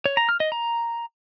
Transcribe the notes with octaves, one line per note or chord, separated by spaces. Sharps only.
C#5
A#5
F6
D#5
A#5